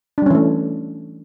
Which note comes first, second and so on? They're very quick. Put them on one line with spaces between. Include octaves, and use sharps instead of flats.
D4 G3 C#4 E3 A3